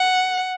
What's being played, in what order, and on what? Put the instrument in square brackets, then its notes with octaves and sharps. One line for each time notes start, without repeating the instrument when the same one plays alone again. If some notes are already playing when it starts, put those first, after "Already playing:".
Already playing: [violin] F#5